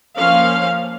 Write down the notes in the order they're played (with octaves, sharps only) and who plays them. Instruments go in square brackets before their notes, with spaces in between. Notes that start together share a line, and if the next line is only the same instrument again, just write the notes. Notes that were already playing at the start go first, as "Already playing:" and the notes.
[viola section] F3 A#3 C#4 F5